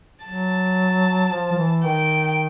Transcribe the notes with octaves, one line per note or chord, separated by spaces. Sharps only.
F#3 A5
F3
F3
E3
D#3 G5